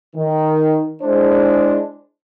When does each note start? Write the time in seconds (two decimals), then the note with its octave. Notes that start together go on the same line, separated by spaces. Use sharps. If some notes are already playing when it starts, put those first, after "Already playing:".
0.16 D#3
1.02 G#3 D4 E4 C5